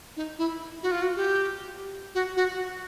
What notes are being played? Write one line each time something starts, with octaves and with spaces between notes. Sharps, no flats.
D#4
E4
F#4
F4
F#4
G4
F#4
F#4